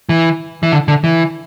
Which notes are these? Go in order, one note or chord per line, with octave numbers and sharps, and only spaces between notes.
E3
E3
D3
D3
E3